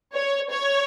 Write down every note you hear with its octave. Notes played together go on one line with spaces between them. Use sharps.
C#5
C#5